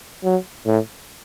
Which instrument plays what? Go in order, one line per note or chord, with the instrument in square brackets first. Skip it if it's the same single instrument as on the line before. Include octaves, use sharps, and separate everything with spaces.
[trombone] F#3
A2